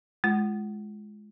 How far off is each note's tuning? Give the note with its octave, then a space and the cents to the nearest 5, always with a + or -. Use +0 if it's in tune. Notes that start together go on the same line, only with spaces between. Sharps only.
G#3 +15 F4 -25